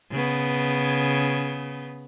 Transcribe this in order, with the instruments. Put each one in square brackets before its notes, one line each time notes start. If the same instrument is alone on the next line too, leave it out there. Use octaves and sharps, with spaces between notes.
[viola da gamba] C#3 B3